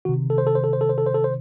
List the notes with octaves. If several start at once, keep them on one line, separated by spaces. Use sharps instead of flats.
C3 D#3 F#4
A4
C5
A4
C5
A4
C5
A4
C5
A4
C5
A4
C5